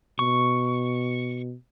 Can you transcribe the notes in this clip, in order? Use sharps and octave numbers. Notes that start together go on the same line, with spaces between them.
B2 C#6